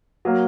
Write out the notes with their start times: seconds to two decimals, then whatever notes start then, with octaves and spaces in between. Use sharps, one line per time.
0.25 F#3 A#3